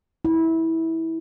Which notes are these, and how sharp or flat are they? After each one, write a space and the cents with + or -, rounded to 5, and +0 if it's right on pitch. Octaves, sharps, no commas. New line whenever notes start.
E4 -20